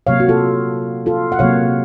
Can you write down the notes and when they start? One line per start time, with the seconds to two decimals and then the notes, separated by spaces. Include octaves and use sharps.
0.07 C3 F#3 A#3 C#5 F5
0.20 F#4
0.29 F4 A4
1.06 F4 A4
1.32 F#5
1.39 C3 F#3 A#3 C#5 F5